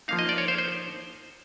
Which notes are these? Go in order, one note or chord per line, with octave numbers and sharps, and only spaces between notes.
F3 A#3 D#4 F5
D#5
D5
C#5
C5
C5